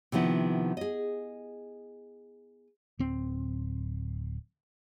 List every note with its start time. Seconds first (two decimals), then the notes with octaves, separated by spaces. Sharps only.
0.12 C3 D#3 F3 B3 E4
0.77 G#4 D#5
2.99 D1 C4